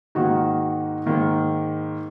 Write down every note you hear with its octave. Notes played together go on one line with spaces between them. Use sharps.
G#2 D#3 A#3 D#4 F#4
G#2 D#3 A#3